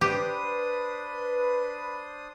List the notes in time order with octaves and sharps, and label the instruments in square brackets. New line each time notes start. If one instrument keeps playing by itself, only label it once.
[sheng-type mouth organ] D4 C5 D#6 [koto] G4 [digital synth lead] B4